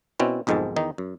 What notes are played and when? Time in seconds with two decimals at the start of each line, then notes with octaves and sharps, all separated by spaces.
0.19 B2 C4 C#4 E4
0.47 B1 F2 G#2 D#3 G#3 A5
0.76 E2 D#3 D#4
0.98 F#2